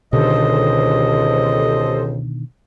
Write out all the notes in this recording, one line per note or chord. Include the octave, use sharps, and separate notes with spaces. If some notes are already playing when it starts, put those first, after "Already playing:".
C#2 B2 D3 D#3 G4 A4 C5 D#5